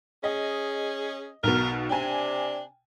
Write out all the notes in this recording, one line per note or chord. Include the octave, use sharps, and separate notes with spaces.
C#4 G#4 D#5
B1 B2 A#4
C3 D4 G5 G#5